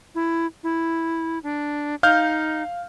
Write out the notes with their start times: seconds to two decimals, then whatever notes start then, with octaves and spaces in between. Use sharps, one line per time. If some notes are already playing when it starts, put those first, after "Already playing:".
0.15 E4
0.63 E4
1.43 D4
2.03 D#4 F5 F6 G6